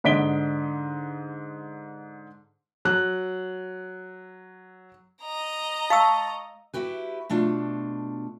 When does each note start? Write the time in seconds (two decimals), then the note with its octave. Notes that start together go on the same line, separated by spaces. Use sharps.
0.04 G#2 D3 D#5 B6 D7 G7
2.85 F#3 F#6
5.22 D#5 A#5
5.90 F5 A5 C#6 E6
6.74 E4 F#4 G4 B4
7.30 B2 A3 D4 F4